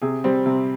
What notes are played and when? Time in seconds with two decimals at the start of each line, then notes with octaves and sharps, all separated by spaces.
0.02 C3 G#4
0.24 G3 C4
0.46 C3